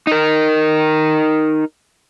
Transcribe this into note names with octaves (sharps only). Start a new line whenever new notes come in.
D#4 A#4